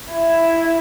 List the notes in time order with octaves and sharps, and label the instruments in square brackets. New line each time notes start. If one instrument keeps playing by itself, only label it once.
[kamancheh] E4